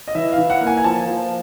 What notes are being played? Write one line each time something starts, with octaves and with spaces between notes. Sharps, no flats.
D#5
E3 E5
F5
E3
F#5
A#3
G#5
G#5
F3 A5
F3